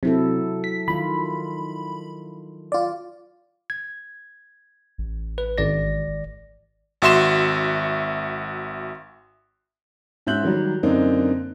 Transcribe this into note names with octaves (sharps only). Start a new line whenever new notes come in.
C3 F#3 E4 A4
B6
D#3 F4 B5
F4 D5
G#6
A1
B4
G#1 D5 A#6
G#1 F#4 E5 C6 E7
G#2 C#4 E5 F#6 G6 F#7
D#3 F#3 G3
F#2 D3 A#3 C4 D4 D#4